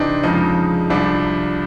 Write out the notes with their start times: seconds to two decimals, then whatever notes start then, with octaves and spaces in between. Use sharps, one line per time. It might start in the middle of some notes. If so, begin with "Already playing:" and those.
Already playing: C3 E3 C4 D4 D#4
0.23 F2 C#3 F3 G#3 D#4
0.90 C2 C3 F3 D4